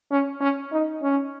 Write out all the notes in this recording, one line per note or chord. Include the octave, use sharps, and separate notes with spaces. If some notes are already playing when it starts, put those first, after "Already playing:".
C#4
C#4
D#4
C#4